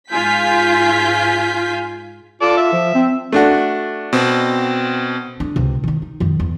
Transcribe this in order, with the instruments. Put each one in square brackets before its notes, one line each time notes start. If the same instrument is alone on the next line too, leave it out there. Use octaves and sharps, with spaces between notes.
[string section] G#2 F4 G#5 G6 B6
[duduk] F4 [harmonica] A4 D5
[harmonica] E5
[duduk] F3
C4
[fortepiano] A3 D4 F#4
[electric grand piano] B2 C4
[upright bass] D3 D4
C#2 C3
D#3 D#4
D#4
F#2 D#3
E2